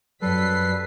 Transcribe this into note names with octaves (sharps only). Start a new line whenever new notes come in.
F#2 F#3 G3 A4 B4 B6 C7